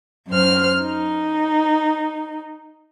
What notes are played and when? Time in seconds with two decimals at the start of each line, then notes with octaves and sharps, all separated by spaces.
0.29 F#2 C5 F6
0.81 D#4